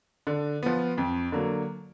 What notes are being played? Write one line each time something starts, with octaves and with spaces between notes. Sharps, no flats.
D3
F3 B3
F2
D3 F#3 A#3